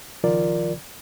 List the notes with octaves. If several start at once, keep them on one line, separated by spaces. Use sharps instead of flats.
C#2 D#3 F3 F4 A#4 D5